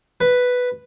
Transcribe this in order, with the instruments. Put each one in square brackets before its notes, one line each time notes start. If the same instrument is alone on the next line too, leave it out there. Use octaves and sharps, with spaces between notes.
[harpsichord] B4